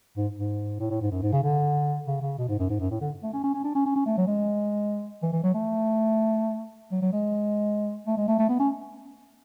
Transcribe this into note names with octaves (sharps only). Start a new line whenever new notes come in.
G#2
G#2
A2
A2
G#2
F#2
G#2
C#3
D3
C#3
C#3
B2
G#2
F#2
G#2
F#2
A2
D3
A3
C#4
C#4
C#4
D4
C#4
C#4
C#4
A3
F#3
G#3
E3
E3
F#3
A3
F#3
F#3
G#3
A3
G#3
A3
A3
B3
C#4